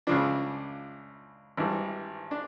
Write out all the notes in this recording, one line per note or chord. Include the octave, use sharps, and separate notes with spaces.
C#2 C#3 F3 D4
G#1 G2 E3 G3
D4